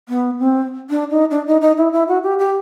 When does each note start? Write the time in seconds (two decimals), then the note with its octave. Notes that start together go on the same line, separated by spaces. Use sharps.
0.09 B3
0.39 C4
0.90 D4
1.10 D#4
1.31 D4
1.47 D#4
1.61 D#4
1.78 E4
1.93 E4
2.08 F#4
2.23 G4
2.39 G4